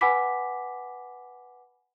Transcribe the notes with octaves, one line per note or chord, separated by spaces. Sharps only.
B4 F#5 G#5 B5 D6 B6